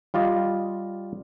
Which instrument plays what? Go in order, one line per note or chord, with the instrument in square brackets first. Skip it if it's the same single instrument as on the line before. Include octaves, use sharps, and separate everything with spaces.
[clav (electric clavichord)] G3 F4 D5 D#5